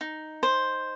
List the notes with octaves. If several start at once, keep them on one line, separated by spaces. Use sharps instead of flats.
D#4
C5